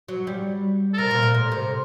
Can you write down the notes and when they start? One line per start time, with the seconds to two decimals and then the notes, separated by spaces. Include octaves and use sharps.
0.08 F#3
0.27 G3
0.93 A4
0.98 C3 A#4
1.11 A#2
1.23 A#2
1.34 A2
1.52 C3